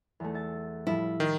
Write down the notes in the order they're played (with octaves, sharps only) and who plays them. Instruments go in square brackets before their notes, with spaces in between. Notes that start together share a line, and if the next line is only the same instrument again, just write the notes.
[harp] E2 A3
E5 A6
[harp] A2 F3 G3 [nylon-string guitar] E4
[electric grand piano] D#3